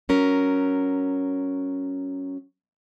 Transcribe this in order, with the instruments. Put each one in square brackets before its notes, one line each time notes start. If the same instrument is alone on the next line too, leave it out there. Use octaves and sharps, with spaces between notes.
[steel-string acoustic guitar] F#3 C#4 A#4